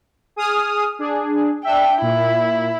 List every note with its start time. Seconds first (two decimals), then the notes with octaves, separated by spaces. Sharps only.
0.36 G#4 D#6 F6
0.99 D4 G#4
1.64 D4 E5 G5
2.02 A#2 E4